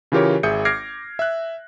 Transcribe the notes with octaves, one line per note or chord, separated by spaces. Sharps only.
C#3 E3 F4 G4 A#4 C#5
G#1 G#4 E5 D#6 G6 C#7
D6 F6 G#6 A#6 C7 D7
E5 F#6